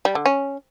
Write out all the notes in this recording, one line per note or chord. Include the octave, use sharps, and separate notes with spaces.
G3
D3
C#4